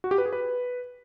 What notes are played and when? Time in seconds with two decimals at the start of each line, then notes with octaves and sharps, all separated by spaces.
0.04 F#4
0.11 G4
0.18 B4
0.25 G#4
0.33 B4